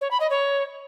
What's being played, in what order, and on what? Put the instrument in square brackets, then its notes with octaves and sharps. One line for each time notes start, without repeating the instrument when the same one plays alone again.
[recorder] C#5
B5
D#5
C#5